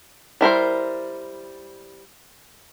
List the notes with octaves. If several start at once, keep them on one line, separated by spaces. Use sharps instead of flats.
G3 E4 A#4 C5